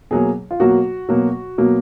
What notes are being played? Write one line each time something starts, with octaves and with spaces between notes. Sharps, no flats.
B2 F#3 A#3 G#4
F4
B2 F#3 A#3 F#4
B2 F#3 A#3
B2 F#3 A#3